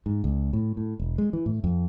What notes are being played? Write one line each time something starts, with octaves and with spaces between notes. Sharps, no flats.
G#2
C#2
A2
A2
E1
G#3
E3
A2
F2